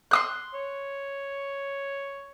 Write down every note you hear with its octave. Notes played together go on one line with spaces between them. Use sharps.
C6 D#6 F#6
C#5